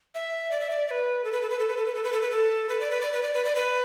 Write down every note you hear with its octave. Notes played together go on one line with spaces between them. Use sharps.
E5
D5
E5
D5
D5
B4
A4
B4
A4
B4
A4
B4
A4
B4
A4
B4
A4
B4
A4
B4
D5
B4
D5
B4
D5
B4
D5
B4